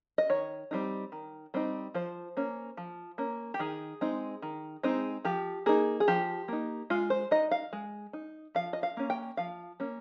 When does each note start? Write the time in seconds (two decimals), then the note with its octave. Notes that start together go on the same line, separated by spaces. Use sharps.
0.18 D#5
0.29 D#3 C#5
0.71 G3 C4 D#4
1.12 D#3
1.54 G3 C4 D#4
1.94 F3 C5
2.37 A#3 C#4
2.77 F3
3.18 A#3 C#4
3.54 G4
3.59 D#3 G#4
4.01 G#3 C4 D#4
4.42 D#3
4.83 G#3 C4 D#4
5.25 F3 G4
5.66 A#3 D#4 G#4
6.00 G#4
6.08 F3 G4
6.48 A#3 D#4
6.90 G#3 F4
7.10 C5
7.31 D#4 D#5
7.51 F5
7.73 G#3
8.13 D#4
8.55 F3 F5
8.73 D#5
8.83 F5
8.97 A#3 C#4
9.10 G5
9.37 F3 F5
9.80 A#3 C#4